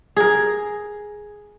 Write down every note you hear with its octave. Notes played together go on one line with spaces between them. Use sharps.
G#4 A#4